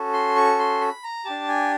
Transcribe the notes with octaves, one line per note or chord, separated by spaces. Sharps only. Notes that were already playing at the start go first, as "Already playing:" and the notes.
Already playing: C#4 F#4 A4
C6
C#6
C6
B5
A#5
D4 G4 A5
G#5